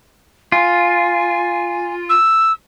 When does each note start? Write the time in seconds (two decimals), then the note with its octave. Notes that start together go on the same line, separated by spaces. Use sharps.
0.52 F4 G#5
2.09 E6